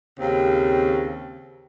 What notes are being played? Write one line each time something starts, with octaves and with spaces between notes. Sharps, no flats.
D#2 C#3 C4